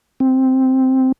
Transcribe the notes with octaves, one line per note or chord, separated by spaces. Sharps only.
C4